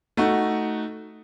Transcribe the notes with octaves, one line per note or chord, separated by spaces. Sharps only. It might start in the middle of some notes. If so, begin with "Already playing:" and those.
A3 D#4 F#4